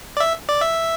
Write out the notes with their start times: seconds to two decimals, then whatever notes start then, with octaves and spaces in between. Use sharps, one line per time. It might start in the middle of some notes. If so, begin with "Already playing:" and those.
0.17 D5
0.20 E5
0.49 D5
0.61 E5